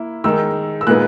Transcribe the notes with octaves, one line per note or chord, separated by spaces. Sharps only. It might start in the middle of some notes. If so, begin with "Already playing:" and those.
Already playing: A#3 E4
D#3 G#3 D#4 E6
E6
A#2 G#3 B3 D#4 F#6